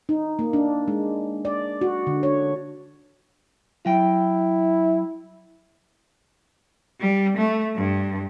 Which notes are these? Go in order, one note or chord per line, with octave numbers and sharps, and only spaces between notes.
D#4
A#3
D4
G#3
D5
F#4
D3
C#5
F#3 E4 G5
G3
A3
G2